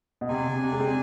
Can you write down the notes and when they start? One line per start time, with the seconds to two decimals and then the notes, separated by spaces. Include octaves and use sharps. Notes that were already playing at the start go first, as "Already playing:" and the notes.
0.21 B2
0.29 C3 D4 G#4 D5 G#5
0.47 C3
0.64 C3
0.72 G#3
0.80 C4